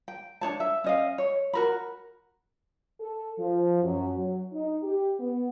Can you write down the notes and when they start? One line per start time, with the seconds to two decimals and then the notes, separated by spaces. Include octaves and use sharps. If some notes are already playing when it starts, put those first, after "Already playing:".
0.08 G5
0.41 D4 D#4 C#5 A5
0.60 E5
0.84 C#4 D#5 F5
1.18 C#5
1.53 F#4 A#4 B5
3.00 A4
3.38 F3
3.83 F#2
4.16 F#3
4.52 D#4
4.83 G4
5.19 B3